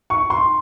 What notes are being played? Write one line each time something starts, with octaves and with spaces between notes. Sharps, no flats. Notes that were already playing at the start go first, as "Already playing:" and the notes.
C#6
C6